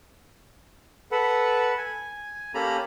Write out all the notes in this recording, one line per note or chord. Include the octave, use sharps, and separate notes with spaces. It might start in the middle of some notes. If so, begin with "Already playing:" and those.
A4 B4 F#5
G#5
A#3 C#4 G4 A4 A#5 B5